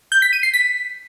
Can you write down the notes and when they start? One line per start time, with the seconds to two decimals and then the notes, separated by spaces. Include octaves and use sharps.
0.12 G6
0.22 B6
0.33 D#7
0.43 C7
0.54 B6